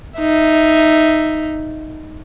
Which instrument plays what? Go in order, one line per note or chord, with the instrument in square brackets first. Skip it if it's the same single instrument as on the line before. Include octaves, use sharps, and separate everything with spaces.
[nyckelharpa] D#4 E5